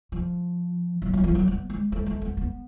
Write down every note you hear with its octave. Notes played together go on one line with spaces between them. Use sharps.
F3
F#3
F#3
F3
F#3
B3
G#3
A3
A3
B3
B3